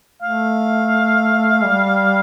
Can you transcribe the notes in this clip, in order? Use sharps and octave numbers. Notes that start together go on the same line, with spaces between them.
A3 F5
G3